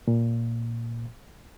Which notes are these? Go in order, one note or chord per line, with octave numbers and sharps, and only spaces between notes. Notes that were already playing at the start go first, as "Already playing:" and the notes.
A#2